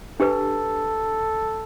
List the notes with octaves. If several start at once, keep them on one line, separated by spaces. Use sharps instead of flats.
D4 G4 A4 B4